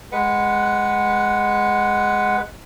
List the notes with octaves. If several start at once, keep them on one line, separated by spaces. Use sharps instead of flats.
G#3 B4 F#5